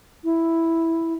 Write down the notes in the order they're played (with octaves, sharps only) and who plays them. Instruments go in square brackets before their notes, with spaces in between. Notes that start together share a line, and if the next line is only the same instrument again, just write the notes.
[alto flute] E4